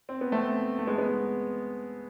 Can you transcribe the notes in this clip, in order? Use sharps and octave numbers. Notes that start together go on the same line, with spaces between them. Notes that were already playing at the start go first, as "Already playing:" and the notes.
C4
B3
A3 C4
A3
G#3 B3
G#3 B3